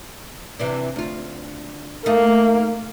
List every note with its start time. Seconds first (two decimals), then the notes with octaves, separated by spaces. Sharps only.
0.60 C3 E3 D4
0.96 D2 F4
2.06 A3 A#3 D#4